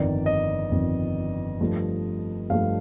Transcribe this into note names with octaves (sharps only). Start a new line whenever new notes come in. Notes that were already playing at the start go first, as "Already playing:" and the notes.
Already playing: G1 F2 D#3 D5
D#5
G1 F2 D#3
G2 F3 A3
G2 F3 A3 F5